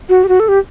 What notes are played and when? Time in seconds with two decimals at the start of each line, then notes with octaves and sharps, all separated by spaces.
0.09 F#4
0.24 G4
0.28 F#4
0.40 A4
0.48 G4